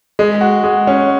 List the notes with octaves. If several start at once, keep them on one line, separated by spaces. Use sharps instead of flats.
G#3
F#4
G#3
C#4